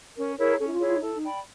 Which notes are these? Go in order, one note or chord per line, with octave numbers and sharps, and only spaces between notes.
C#4 A#4
E4 G#4 A#4 C#5
C#4 A4
E4
F4
E4 G#4 C#5
F4
D#4
E4 A4
D#4
D5 G5 B5